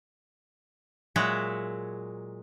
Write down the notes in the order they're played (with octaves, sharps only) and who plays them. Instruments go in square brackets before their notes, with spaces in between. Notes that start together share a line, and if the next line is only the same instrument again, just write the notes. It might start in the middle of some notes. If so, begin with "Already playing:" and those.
[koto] A#2 F#3 G#3 F#4 E5